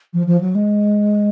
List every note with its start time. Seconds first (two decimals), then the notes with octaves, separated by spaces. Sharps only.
0.13 F3
0.26 F3
0.41 F#3
0.55 G#3